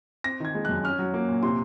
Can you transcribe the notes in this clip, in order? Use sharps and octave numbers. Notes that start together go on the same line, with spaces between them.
C4 A#6
D#3 G#6
G#3
F#6
F#2
C#4 F6
F#3
A#3
A#2
C3 C6